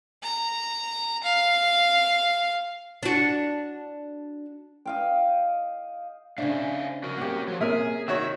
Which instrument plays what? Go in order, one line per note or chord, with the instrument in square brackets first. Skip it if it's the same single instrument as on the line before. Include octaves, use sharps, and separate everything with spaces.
[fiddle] A#5
F5
[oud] D4 F#4
[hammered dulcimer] D#5 F5 G5
[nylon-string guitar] C#3 D4 [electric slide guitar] C5 E5 F5
[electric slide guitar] F#4 A#4
[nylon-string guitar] A#3 C4 [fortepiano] G4 F#5
[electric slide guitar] F3 F#3
[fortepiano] C3 A#4 E5 [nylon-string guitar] A#3 C#4 [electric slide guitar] G#4
[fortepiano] D#3 F#4 C#5 [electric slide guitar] E5